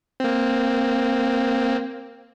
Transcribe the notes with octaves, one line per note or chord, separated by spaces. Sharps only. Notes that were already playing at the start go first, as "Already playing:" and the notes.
A#3 C4